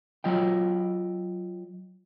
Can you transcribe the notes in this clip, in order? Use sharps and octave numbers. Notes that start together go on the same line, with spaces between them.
F#3 F4 D#5 G5